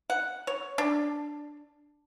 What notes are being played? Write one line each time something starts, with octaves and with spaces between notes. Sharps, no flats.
F#5
C#5
D4